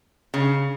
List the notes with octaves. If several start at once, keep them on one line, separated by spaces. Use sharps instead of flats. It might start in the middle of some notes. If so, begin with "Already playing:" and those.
C#3